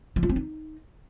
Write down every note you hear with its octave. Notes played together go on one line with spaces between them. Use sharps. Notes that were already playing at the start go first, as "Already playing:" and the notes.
F3
F4
C4
D#4